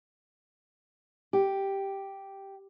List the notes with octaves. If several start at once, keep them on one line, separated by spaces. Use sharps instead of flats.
G4